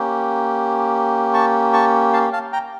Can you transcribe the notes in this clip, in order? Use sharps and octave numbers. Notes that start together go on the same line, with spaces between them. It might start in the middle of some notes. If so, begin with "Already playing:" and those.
Already playing: A#3 C#4 G4
A5 C#6
A5 C#6
F5 A5
F5 A5
G5 A#5